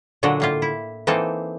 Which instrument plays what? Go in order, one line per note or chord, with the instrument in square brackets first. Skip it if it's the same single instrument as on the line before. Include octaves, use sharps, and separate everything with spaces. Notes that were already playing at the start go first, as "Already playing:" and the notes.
[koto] A#2 D3 F#3 D4 A4 D#5
A2 A#3 F4
E4
E3 A#3 C4 D#4 A4